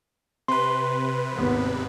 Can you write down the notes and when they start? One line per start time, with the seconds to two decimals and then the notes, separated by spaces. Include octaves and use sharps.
0.48 C3 B4 C6
1.34 G#1 D#2 B3